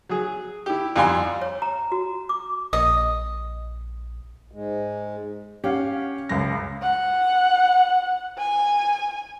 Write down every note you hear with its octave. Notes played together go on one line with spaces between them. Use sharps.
F#3 G#4
E4 G4
F2 G3 F5 G#5 A#5 C6
C#5
A#5
F#4
D6
A#1 D#5
G#2 G#3
C#4 G4 F5 F#5
C#2 F#2 A#6
F#5
G#5